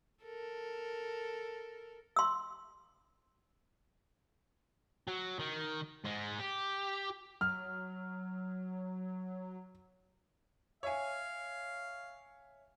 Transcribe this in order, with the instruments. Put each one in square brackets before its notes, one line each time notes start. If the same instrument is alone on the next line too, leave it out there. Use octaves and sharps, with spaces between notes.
[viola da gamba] A4 A#4
[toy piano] C6 E6
[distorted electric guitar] F#3
D#3
G#2 G#3
G4
[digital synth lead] F#3 [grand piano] F6
[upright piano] C#5 E5 G#5 [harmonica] F5